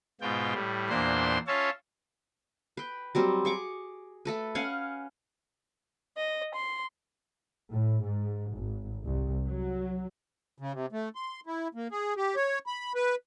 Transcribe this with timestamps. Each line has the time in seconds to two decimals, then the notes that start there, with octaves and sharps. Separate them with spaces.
0.21 G#2 B2 F4 G5
0.54 A2 G3
0.89 E2 A#2 A#3 D4 C5 C6
1.47 C#4 F4 C#5 E5 F5 A5
2.77 B4 G5
3.15 F#3 G3 C4
3.45 G#4 C#6 D6
4.25 A3 A4 B4
4.55 C#4 F5 F#5 G#5
6.16 D#5
6.54 C6
7.71 A2
8.03 G#2
8.52 G#1
9.03 C2
9.47 F#3
10.58 C#3
10.72 C3
10.92 A3
11.15 C6
11.46 E4
11.75 A#3
11.91 G#4
12.17 G4
12.36 C#5
12.66 B5
12.95 B4